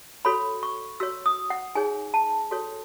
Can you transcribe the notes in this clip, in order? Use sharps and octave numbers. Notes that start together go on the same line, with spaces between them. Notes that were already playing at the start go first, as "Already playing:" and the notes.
F#4 A4 C#5 B5
C#6
F#4 C#5 E6
D#6
F#5
D#4 G#4 C#5 G#5
A5
F#4 A4 C#5